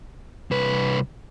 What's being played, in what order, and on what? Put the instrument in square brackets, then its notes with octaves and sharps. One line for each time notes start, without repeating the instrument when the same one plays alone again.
[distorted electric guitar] C2 B4